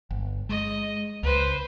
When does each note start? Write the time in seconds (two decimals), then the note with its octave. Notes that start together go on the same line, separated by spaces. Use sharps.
0.11 G1
0.49 G#3 D#5
1.23 C#2 B4 C5